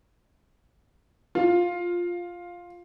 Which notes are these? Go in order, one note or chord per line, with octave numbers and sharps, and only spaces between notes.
F4